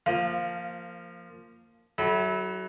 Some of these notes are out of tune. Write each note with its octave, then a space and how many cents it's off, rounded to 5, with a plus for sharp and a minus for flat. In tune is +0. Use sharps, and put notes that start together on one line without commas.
F3 -5 A#3 -20 F5 +5
F#3 +20 E4 -20 A4 -25